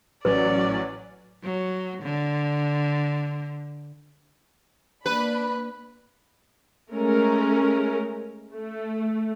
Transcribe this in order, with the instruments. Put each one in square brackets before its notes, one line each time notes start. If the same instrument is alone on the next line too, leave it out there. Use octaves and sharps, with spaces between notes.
[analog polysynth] A1 F#3 C#4 [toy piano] B4 [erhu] D5
[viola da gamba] F#3
D3
[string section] A#3 D4 B5 [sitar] B4
[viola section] G#3 A3 C#4 A#4
A3